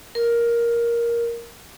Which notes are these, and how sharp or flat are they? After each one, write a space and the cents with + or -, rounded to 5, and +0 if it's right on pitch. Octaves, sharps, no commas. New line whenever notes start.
A#4 +10